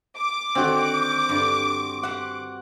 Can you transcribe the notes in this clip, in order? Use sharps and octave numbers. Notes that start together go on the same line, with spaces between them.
D6
D3 D#3 C4 F#4
G2 D3
G4 C5 F#5 C6